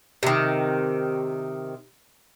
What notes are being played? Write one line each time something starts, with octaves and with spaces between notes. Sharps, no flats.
C3 D#3